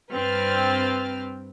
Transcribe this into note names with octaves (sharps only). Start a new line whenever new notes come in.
G2 C4 B4 G5 F6 A6